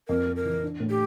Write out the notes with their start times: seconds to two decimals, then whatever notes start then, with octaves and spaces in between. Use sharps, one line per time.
0.08 F2 A#4
0.26 F2
0.36 A#4
0.45 E3
0.63 D4
0.80 A2
0.90 G4